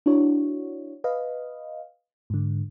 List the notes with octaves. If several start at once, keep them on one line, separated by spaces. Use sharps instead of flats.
D4 E4 F#4 C#5
B4 D#5 F5
G#2 D3